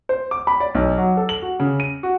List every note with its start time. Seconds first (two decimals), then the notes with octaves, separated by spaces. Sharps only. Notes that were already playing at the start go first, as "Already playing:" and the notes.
0.09 C5
0.31 D6
0.47 B5
0.60 D5
0.75 B1
0.98 F#3
1.17 A4
1.29 F#7
1.42 F#4
1.60 C#3
1.80 D#7
2.03 F#4